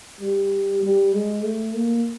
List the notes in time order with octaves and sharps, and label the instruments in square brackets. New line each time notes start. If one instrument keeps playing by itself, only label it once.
[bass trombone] G3
G3
G#3
A3
A#3